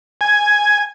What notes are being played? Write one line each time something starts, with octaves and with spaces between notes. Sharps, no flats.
G#5